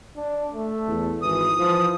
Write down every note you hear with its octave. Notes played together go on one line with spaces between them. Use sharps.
D4
A3
E2
G#1 E3 D#6
E3 F3